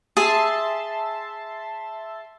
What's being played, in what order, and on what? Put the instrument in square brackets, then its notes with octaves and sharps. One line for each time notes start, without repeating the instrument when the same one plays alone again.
[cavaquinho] G#4 [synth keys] E5 A5 C6